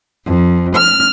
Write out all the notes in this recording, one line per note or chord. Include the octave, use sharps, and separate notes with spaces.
F2
F6